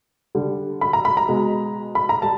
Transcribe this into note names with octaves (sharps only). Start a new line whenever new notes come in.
D3 G3
B5
A#5
B5
A#5
B2 G#3
B5
A#5
G3 A5